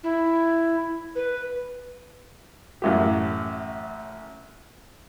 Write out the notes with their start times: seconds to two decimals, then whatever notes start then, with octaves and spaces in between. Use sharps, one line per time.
0.03 E4
1.15 B4
2.82 A1 F#2 G4